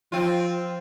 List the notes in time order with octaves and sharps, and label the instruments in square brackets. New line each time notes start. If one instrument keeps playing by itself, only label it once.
[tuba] F3 [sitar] C4 F4